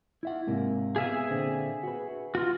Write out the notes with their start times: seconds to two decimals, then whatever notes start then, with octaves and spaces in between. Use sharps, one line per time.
0.23 E4 E5 F#5
0.47 G#2 C3 A#3
0.96 B3 G#4 E5 F5 G#5
1.30 A#2 D3 C4
1.83 F#4 B4
2.35 F4 F#4